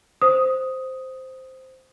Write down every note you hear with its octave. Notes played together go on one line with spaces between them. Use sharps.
C5 D#6